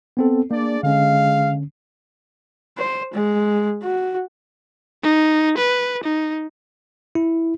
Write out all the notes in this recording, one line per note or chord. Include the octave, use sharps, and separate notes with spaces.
B3 C4 A4
A#3 D4 G#4 D5
D3 G#3 C#4 F5
C5
G#3
F#4
D#4
B4
D#4
E4